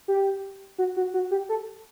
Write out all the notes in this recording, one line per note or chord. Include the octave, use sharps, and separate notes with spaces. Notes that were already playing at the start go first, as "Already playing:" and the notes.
G4
F#4
F#4
F#4
G4
A4